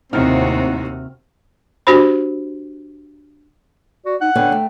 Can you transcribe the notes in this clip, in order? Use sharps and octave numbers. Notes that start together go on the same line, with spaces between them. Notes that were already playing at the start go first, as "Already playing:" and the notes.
D#2 A2 C3 C4 D#4 F#4 F6
D4 F#4 G4 C5 B5
F#4 D5
D#4 F#5
D3 B3 C#4 G5
A3